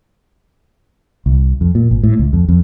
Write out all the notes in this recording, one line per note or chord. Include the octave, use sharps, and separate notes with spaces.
C2
F2
A#2
G#1
A2
C#2
F2
F2